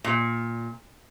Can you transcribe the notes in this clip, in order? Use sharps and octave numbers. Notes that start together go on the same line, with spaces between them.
A#2